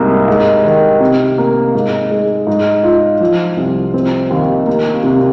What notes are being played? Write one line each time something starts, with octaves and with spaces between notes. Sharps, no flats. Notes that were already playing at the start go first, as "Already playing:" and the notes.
Already playing: C2 G#2 A#3
G#2
D#3
C3
A#3
G#2
G#3
G#2
F4
F3
C2
C4
D#2
A#3
C3